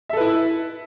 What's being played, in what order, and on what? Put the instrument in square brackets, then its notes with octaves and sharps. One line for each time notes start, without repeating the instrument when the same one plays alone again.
[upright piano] E5
A4
B4
E4